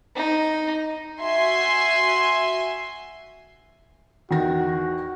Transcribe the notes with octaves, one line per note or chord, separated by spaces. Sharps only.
D#4
F#4 E5 G#5 C6
E2 D#3 F#4 A#6